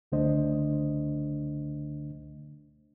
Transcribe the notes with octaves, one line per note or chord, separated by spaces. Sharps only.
C#2 D3 A3 D4 C5 D#5